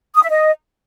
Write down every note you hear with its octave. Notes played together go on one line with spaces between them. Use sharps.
D#6
E5
D#5